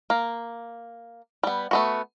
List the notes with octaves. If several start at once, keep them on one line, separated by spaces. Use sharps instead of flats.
A#3
G3 B3
A3 B3 F#4